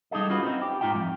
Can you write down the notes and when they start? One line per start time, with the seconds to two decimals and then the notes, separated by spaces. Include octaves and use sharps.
0.11 G3 D#4 G#4 A4 D#5
0.29 C#4 F4 F#4 B4
0.43 C4 D#4 E4
0.62 G4
0.81 G#2 D#4 F4 E5 G5
0.95 F2